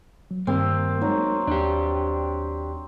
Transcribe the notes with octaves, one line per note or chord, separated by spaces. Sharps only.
F#3
G2 D#3 G3 A#3 C4
F#3 G#3 D#4
D#2 D4 G4